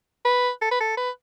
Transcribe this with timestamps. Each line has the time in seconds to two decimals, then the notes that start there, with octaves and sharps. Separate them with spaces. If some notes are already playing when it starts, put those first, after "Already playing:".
0.25 B4
0.62 A4
0.71 B4
0.80 A4
0.97 B4